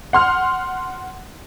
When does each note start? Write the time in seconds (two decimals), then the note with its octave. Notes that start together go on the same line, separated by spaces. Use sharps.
0.13 F#5 C6 F6